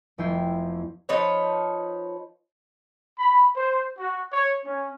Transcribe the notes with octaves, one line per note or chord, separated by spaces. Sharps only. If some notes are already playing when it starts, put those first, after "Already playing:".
F1 F2 B3 E4 G5 C6
F3 D#4 B4 C#5
B5
C5
F#4
C#5
C#4